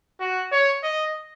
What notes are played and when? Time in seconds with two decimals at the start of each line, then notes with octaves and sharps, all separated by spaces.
0.20 F#4
0.52 C#5
0.83 D#5